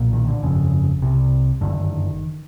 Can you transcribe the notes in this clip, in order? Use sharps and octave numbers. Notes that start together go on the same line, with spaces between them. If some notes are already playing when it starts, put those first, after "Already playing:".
Already playing: B1 A#2
D#3
D3
G1 F2 C#3
C2 C3
G1 F#2 D3 D#3